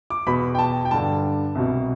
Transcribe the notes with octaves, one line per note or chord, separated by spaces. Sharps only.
D6
E2 B2 B5
G5
A5
G5
G2 D3 A5
C2 B2